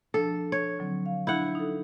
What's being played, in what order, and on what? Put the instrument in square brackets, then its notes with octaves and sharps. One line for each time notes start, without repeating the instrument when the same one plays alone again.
[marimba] F3 D4 [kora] A4
[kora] C#5
[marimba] D3 F#3 C4
F5
[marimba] D4 G6 [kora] E4 F#5
[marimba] D#4 A4